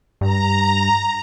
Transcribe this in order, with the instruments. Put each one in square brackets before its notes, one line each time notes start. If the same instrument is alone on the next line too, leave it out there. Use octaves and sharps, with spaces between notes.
[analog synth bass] G2 [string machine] A#5